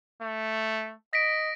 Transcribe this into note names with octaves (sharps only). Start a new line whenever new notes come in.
A3
D#5 A#6 B6 D7